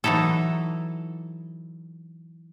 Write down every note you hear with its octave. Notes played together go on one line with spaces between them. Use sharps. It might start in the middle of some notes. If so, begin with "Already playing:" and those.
E3 F#3 D#4 E4 A4